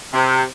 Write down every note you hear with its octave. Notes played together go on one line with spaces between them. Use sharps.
C3